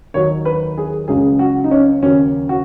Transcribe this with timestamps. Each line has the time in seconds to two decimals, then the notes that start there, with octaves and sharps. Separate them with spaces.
0.14 D#2 D#3 F#3 C#5
0.45 B4
0.78 G#4
1.08 C#2 C#3 F#3 G#4
1.39 F#4
1.64 D#4
1.71 C#4
2.02 D#2 C#3 F#3 C#4
2.49 F#4